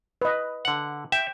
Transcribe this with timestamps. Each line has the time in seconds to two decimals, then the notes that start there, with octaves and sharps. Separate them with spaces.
0.22 B4 D#5
0.65 D3 F#5
1.12 E5 G5